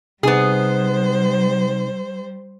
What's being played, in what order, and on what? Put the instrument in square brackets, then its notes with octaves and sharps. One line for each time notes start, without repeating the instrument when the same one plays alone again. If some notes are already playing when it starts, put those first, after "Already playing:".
[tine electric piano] C3 D#4 [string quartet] G3 C5 [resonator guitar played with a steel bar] B3 G#4